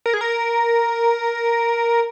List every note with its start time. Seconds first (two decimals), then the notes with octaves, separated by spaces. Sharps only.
0.06 A#4
0.14 G#4
0.21 A#4